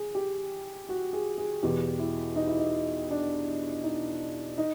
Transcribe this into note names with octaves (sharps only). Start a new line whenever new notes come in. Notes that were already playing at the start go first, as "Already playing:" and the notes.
Already playing: G#4
G4
F#4
G#4
G#4
E2 B2 G4
E4
D#4
E4
D#4
D4
D#4
D#4